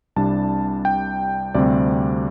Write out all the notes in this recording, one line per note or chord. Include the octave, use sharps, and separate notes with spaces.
C2 C3 G3 D4 A5
G5
D2 C3 G3 C4 D5